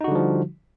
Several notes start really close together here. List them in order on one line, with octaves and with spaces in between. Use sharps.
D#4 F#4 D3 G3 F3